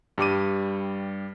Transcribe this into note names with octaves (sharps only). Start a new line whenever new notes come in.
G2 G3 D6 D#7